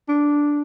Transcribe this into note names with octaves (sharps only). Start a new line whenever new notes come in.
D4